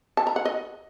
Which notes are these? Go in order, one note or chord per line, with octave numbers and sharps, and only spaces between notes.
A5
A#5
F#5
D#5